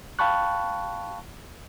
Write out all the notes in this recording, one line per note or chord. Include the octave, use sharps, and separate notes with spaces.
F5 G5 A5 B5 C#6 F#6